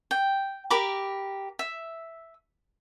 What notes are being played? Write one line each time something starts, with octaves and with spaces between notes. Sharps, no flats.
G5
G4 A#4 B5 D6
E5